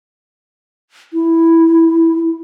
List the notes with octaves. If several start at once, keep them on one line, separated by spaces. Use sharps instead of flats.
E4